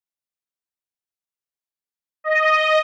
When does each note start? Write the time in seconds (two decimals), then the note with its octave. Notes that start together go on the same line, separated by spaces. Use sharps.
2.24 D#5